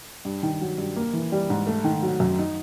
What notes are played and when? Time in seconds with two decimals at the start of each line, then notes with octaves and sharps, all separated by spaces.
0.25 G2
0.43 D#3
0.61 F#3
0.78 G2
0.96 A#3
1.13 E3
1.32 G3
1.50 G#2
1.67 A3
1.84 D#3
2.03 F#3
2.20 F#2
2.39 D#4